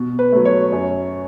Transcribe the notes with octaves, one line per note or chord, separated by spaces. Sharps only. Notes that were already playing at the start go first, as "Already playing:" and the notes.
Already playing: B2
B4
F#3 A3
C#5
F#2